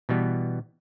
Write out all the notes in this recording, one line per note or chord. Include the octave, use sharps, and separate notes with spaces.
B2 E3 G3 B3